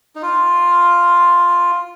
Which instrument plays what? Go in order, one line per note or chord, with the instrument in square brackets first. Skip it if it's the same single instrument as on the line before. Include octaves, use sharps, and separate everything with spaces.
[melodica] D#4
F4